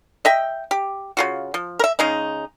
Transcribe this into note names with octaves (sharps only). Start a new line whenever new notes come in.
D#5 E5 G5
G4
C#3 F4 F#4
F3
A#4 E5
C#3 G#3 D#4